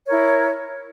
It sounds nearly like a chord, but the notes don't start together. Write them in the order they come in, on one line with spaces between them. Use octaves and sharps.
C#5 A#4 E4